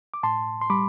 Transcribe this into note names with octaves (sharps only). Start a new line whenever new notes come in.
D6
A2 A5 C6
C6
G3 B5 D6